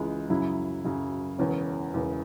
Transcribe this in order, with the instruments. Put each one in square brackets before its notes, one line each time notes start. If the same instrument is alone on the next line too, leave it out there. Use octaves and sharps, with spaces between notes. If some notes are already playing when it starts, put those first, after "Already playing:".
Already playing: [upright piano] C#2 C#3 E3 G#3
F#2 C#3 F#3 E4
F#2 C#3 F#3
E1 E2 C#3 C#4
E1 E2 C#3